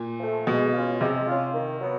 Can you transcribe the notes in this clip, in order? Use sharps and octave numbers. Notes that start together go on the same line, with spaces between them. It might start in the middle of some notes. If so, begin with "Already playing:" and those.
Already playing: A#2
F3 A3
B2 G#3
C#4 F4
C3 G#3
C#4 F4
D#3
F#3 B3